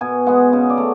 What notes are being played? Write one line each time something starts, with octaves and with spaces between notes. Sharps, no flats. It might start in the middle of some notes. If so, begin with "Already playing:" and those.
B2 G#5
G#3 B3 F#5
C#3
D5
A3